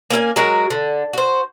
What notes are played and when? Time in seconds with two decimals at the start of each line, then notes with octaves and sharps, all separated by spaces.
0.10 A#3 C#4 E5 G#5
0.36 F#3 G#3 F#4 A#4
0.70 D3
1.13 F#4 C5